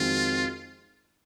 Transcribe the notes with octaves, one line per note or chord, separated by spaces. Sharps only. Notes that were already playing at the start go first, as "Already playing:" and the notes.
Already playing: F2 D#3 G#3 C4 F4 F#4